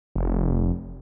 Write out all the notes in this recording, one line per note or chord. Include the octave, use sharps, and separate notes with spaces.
F1